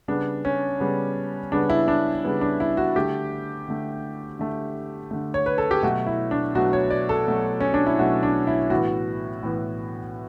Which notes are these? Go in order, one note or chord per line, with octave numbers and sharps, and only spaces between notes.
C#3 G3 B3 D4
C#4
C#3 G3 B3
C#3 G3 B3 D4
E4
D4
C#3 G3 B3
D4
E4
F#4
D3 A3 G4
D3 A3
D3 A3
D3 A3
C#5
B4
A4
G4
B2 F#3 A3 F#4
E4
D4
B2 F#3 A3 F#4
C#5
D5
A4
B2 F#3 A3
C#4
D4
E4
B2 F#3 A3 F#4
D4
E4
A2 E3 B3 F#4
A2 E3 B3